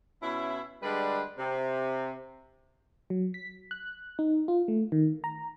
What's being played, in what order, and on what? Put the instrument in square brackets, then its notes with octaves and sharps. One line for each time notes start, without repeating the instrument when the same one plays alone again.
[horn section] B2 C#4 E4
D3 G3 G#3 B4 D5
C3
[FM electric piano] F#3
B6
F#6
D#4
F4
A3
D#3
A#5